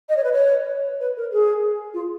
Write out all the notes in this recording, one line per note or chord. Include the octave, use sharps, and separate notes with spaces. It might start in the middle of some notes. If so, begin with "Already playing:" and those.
D#5
C#5
B4
C#5
B4
A#4
G#4
F4